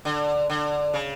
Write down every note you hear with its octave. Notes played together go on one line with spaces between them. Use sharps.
D3
D3
C#3